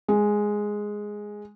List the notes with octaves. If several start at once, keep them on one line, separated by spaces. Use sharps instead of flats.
G#3